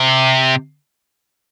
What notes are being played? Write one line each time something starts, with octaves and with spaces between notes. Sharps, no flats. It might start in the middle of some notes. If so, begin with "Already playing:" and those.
Already playing: C3